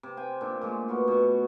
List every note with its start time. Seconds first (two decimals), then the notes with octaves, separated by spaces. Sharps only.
0.03 C3
0.17 C5 G5 G#5
0.41 A#2 D4
0.61 A#2 G#3 A3
0.88 B2 B3 F#4 F5
1.08 B2 C#6